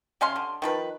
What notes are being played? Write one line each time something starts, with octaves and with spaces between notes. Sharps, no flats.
C3 C#4 F5 C6
D3
D#3 F3 B4